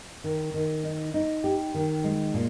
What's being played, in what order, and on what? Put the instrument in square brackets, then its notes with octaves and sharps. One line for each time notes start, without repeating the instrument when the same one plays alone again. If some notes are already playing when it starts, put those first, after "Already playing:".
[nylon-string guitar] D#3
D#3
D#4
D#4
G4
D#3
G#3
A#2